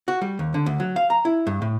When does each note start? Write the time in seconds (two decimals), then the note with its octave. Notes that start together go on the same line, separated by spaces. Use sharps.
0.08 F#4
0.22 G3
0.39 D#2
0.54 D3
0.66 D2
0.80 F#3
0.96 F5
1.10 A#5
1.25 E4
1.47 G2
1.62 A2